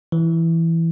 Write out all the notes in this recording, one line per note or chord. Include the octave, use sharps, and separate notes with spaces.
E3